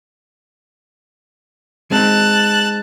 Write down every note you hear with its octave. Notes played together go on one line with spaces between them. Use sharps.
G#3 C4 D#4 A5 F#6